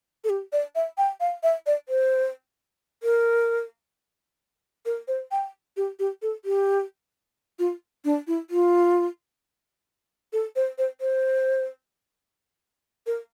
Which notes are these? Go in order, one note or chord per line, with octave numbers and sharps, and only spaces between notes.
A4
G4
D5
E5
G5
F5
E5
D5
C5
A#4
A#4
C5
G5
G4
G4
A4
G4
F4
D4
E4
F4
A4
C5
C5
C5
A#4